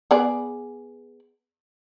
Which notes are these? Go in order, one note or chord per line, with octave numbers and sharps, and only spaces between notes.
B3 G#4 D5